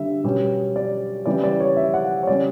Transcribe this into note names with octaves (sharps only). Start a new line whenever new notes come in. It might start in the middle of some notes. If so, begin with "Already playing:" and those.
Already playing: D3 G3 E5
B2 G3 C#4
D5
C#3 E3 G3 D5
D5
C#5
E5
F#5
C#5
C#3 G3 C#4 D5